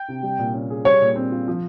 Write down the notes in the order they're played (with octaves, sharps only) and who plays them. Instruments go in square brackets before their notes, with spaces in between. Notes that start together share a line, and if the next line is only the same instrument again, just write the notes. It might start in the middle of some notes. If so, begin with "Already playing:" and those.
Already playing: [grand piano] G5
[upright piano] C3
G3
A#2
C#4
G#4
[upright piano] G3 [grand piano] C#5
[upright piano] A#2
C4
F4
F3